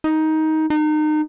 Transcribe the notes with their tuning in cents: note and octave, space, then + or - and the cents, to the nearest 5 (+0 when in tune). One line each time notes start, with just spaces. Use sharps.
D#4 +15
D#4 -30